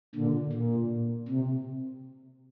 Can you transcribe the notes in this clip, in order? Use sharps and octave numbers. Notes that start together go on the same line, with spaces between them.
A#2 D3
A#2
C3